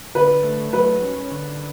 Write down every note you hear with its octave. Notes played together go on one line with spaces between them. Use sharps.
D3 B4
A3
F#3 B4
C#4
D3